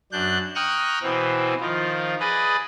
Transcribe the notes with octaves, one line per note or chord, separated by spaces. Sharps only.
F#2 D4 F#6 G6
G5 A#5 C#6 D#6 F6 F#6
B2 E3 C4
D#3 F3 F4
G#4 B4 D5 D#5